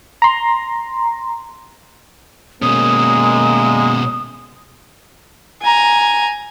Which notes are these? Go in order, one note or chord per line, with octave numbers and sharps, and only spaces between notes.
A#5 C6
B2 G#3 A#3 C#4 D#6
G#5 A#5